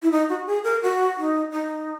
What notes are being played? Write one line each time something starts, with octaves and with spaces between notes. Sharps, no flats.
E4
D#4
F#4
G#4
A#4
F#4
D#4
D#4